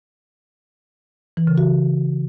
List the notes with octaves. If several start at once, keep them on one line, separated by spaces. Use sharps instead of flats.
E3
C#3
F#4